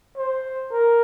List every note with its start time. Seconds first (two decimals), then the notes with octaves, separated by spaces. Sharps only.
0.17 C5
0.71 A#4